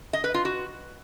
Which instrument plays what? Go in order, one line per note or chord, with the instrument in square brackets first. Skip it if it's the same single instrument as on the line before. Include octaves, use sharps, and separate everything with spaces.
[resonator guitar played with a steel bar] D#5
B4
F4
F#4